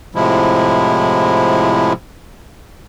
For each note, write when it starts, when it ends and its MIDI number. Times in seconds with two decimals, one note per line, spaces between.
0.15 1.93 45
0.15 1.93 48
0.15 1.93 53
0.15 1.93 56
0.15 1.93 64